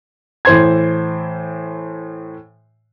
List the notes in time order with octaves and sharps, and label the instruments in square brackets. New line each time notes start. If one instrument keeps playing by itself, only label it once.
[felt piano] A2 E3 C5 C6 G#6